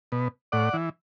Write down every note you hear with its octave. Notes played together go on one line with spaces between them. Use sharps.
B2
A2 D5 F#5
E3